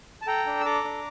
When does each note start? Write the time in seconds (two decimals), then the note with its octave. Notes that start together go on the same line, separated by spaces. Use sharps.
0.22 A5
0.27 A4 G5 A#5
0.46 D4
0.60 E6
0.65 A4 A#5 D6
0.84 D4